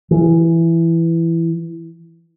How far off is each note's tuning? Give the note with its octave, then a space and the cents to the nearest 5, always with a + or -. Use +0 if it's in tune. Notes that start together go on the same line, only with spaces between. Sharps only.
E3 +10